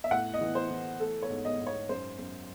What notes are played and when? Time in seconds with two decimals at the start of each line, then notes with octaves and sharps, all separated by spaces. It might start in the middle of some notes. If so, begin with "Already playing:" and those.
0.04 E5
0.11 A2 F#5
0.34 D#5
0.41 E3
0.55 C5
0.70 E3
1.00 A3 A4
1.22 C#5
1.30 G#2
1.45 D#5
1.59 G#2
1.67 C#5
1.89 F#2 C5
2.19 F#2